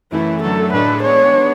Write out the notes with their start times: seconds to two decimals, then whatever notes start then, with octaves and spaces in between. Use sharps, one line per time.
0.12 F#2 E3 A3 E4
0.42 F#2 D3 F#3 A3 A4
0.73 A2 G#3 D4 A4 B4
1.03 G#3 B3 D4 C#5